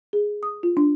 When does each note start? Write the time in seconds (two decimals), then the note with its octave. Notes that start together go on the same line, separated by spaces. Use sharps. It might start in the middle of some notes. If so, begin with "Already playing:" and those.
0.13 G#4
0.43 D#6
0.63 F4
0.77 D4